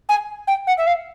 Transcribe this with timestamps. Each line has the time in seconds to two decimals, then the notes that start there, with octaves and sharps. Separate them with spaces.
0.09 G#5
0.47 G5
0.67 F#5
0.77 E5
0.86 F5